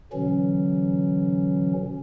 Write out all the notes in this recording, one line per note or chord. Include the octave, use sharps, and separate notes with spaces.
B2 D3 E3 F#3 C#4